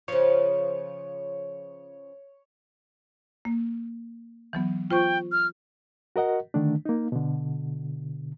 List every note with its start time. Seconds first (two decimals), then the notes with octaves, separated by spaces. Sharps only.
0.08 C#3 F3 C#5
3.45 A#3
4.53 E3 F#3 B3
4.91 F4 C5 G5 C#6
5.32 F6
6.16 F#4 A#4 D#5 F#5
6.54 D3 D#3 A3 D4
6.85 A#3 D#4
7.12 B2 D3